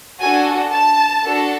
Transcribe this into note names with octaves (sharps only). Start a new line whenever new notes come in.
D4 F#4 A4 G#5
A5
D4 F#4 A4